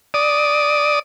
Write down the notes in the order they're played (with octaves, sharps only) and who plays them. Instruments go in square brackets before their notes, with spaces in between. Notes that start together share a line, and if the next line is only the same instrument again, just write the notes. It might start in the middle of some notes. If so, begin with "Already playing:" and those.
[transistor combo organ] D5 D#6